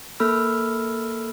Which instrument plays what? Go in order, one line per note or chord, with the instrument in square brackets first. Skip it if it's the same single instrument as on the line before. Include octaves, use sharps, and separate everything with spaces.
[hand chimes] A#3 A4 B5 E6 F6